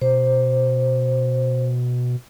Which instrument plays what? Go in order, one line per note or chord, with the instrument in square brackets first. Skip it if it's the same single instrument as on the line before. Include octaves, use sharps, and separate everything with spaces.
[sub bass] B2 [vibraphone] C5